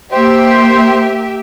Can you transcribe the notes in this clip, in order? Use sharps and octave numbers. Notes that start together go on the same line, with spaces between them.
A#3 G4 C5 E5